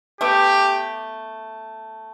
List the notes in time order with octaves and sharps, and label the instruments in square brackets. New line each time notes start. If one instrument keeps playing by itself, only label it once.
[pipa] A3 B3 [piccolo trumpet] G4